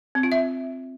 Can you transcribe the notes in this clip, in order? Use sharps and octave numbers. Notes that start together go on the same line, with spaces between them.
C4
F4
E5